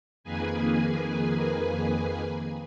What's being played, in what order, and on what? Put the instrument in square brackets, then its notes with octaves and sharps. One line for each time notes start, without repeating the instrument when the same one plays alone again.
[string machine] F2 D#3 A#3 G#4 B4 G#5